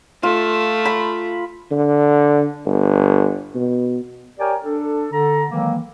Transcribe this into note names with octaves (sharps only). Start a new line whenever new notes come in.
A3 F4
B5
D3
G1
B2
G4 A#4 C#5 D5 G5 G#5
D4 A4
D3 A4 A#5
D#3 E3 F#3 G#3 A#3